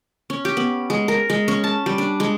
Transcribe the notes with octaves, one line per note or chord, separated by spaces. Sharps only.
C#4
G4
B3
G#3
A#4
G#3
C#4
A5
G3
D4
G#3